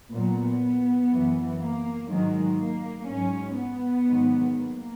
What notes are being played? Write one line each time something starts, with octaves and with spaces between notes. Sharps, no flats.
A#2 F#3 B3
F#2 E3
A#3
G#2 D#3 F#3 G#3
A#3
G#2 F#3 C#4
B3
G#2 D#3 F#3
A#3